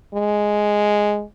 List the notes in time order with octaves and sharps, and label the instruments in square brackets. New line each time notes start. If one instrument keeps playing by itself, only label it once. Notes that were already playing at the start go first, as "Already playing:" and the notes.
[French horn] G#3